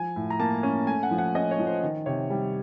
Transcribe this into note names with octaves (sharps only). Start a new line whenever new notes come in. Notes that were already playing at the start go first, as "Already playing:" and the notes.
Already playing: F3 G#5
A2
A#5
A#3 A5
C#4
A3 G#5
F#5
F3
F#5
C#4 D#5
C#5
F3
C5
D#3
C3 C#5
G3